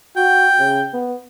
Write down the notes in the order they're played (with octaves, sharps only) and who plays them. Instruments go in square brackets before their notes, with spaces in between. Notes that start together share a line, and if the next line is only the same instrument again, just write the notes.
[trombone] F#4 [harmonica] G5
[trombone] C#3
B3